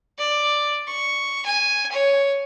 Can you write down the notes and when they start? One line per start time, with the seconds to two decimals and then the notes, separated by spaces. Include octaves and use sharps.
0.18 D5
0.88 C#6
1.46 G#5
1.92 C#5